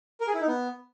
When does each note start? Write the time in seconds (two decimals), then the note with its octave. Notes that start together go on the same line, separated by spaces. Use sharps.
0.21 A#4
0.27 G#4
0.34 E4
0.41 D#4
0.47 B3